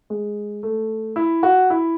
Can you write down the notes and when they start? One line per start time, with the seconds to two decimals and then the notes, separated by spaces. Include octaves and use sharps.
0.10 G#3
0.63 A3
1.16 E4
1.43 F#4
1.70 E4